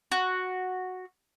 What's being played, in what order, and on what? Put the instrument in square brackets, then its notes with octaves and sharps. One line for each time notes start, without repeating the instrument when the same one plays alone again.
[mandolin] F#4